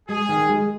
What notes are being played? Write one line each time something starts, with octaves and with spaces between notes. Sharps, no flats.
G#3 G#4
D#3
G#3